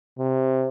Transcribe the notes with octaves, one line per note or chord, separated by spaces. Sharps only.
C3